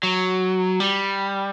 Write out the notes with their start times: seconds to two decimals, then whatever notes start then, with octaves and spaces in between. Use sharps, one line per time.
0.03 F#3
0.80 G3